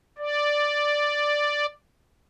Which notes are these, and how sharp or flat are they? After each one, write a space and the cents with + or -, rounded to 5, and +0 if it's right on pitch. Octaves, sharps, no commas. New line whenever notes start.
D5 +0